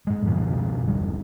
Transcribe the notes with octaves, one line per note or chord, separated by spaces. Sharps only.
G#2 G#3
F2 B2 D#3 F3
D1 G#1 G3